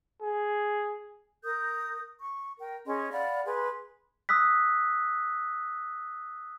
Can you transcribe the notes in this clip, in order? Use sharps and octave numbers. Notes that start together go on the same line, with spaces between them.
G#4
A#4 D#6 G6
C#6
A#4 G5
C#4 G#4 D#5 C6
D5 F5 F#5 B5
G#4 B4 C6
D#6 E6 F#6 B6